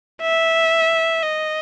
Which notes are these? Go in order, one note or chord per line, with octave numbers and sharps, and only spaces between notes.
E5
D#5